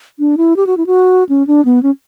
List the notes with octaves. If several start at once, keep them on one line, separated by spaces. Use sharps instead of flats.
D4
E4
G4
F#4
E4
F#4
C#4
D4
B3
C#4